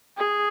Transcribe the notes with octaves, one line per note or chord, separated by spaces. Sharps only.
G#4